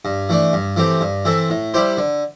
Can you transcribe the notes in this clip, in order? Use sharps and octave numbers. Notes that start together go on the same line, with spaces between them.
G2
E3 A3 D4
G2
E3 A3 C4 G4
G2
E3 C4 A4 E5
A2
G3 E4 G4 C5
D3